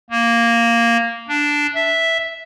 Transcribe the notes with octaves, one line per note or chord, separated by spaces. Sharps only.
A#3
D4
E5